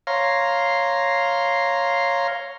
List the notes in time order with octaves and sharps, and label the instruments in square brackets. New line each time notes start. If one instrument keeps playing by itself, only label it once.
[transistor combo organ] C#5 F5 A#5 C6